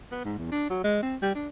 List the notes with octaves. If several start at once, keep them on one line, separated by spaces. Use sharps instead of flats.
B3
G#2
E2
D4
F#3
G#3
C4
G3
D4